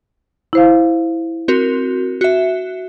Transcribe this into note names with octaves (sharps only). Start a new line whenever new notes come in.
E4 C5 F5
C4 F#4 A#4
F#4 E5